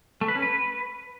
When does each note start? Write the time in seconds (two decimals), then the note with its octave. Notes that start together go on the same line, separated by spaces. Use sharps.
0.21 A3
0.28 B4
0.35 C#4
0.42 B4